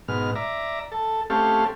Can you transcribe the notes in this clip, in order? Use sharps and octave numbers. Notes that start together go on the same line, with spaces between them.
G#2 B2 F6
D5 E5 A#5
A4
A3 C4 C#4 G4 A4 F5